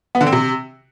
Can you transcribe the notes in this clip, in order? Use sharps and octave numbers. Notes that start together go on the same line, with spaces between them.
B3
D3
C4
C3